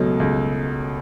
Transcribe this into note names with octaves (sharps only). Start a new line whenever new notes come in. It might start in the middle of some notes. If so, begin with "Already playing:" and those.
Already playing: C#2 B2 F#3 A3
C#2